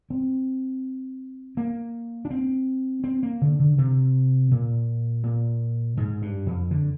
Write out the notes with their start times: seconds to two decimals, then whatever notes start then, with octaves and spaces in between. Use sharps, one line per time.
0.10 C4
1.57 A#3
2.25 D4
2.30 C4
3.04 C4
3.23 A#3
3.41 D3
3.59 D3
3.78 C3
4.51 A#2
5.24 A#2
5.97 G#2
6.22 G2
6.46 F2
6.71 D3